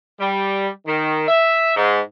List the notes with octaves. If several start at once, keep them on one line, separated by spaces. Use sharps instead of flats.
G3
D#3
E5
G#2